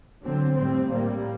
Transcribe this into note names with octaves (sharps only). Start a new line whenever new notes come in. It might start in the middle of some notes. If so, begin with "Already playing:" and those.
D3 F#3 C4
A2 G3 C4
A2 G3 A#3